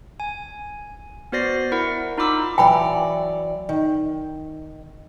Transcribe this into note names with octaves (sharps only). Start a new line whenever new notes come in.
G#5
B3 F#4 C5 D5 A#6 C7
E4 A#4 F#5
D#4 F4 B5 D6 E6
E3 F#3 D5 G5 G#5 B5
D#3